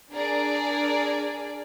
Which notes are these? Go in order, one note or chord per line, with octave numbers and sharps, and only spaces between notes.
D4 G#4 A#4 D5